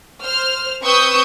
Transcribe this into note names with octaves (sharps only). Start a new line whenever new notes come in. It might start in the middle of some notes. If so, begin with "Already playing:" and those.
C5 F6
C4 B4 C#6 D#6 E6 G6